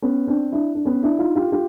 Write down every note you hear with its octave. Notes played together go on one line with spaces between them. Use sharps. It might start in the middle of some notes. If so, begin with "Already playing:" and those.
B3 C#4
C4 D4
D4 E4
D4
B3 C#4
D4 E4
D#4 F4
F4 G4
F4 G4